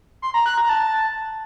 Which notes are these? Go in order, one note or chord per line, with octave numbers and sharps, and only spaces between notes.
C6
A#5
F#6
A#5
A5